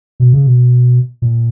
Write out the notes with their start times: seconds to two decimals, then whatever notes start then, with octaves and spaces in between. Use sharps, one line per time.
0.20 B2
0.33 C#3
0.47 B2
1.22 A#2